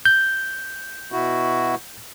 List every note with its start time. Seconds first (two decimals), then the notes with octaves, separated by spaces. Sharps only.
0.05 G6
1.12 B2 E4 F#4